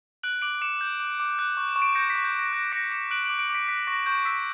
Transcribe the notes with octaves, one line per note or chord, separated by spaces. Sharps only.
F#6 D7 F#7
D6 D7 F#7
D6 C#7 E7
G6
D6
D6
F#6
C#6
E7
C#6
D7
G6 A#6 C#7
B6
C#6
G6
C#6 A#6
F#6 A#6
D6 A#6 C#7
D6 C#7 E7
F#6 D7 F#7
D7 F#7
D6
D7 F#7
D6
B6 D7
F#6 B6
C#6 A#6
C#6 G6
E6 B6